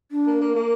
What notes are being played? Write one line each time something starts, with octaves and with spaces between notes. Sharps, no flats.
D4
A#3
A#3
A#3